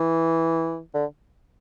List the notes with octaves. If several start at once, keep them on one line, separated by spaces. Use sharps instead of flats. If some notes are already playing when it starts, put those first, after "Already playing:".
Already playing: E3
D3